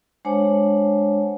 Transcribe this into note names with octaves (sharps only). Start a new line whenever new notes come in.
G#3 D4 C5 C#5 F#5 A5